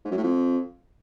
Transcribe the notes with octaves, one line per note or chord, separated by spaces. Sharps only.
G#2
F#2
A2
F2